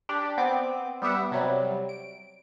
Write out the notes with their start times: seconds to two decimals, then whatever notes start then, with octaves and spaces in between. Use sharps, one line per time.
0.09 D4 G4 D5
0.38 B3 C4 D6
1.02 G3 B3 G4 E5 F#5
1.32 C3 F#3 G3
1.89 D7